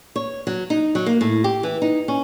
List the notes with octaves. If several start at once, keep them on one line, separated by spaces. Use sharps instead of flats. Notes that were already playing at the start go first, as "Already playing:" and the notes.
C#5
F#3
D#4
F#3
A#3
A2
G4
E3
D#4
C#4